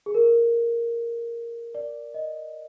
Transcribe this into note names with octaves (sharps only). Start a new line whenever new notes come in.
G#4
A#4
D5
D#5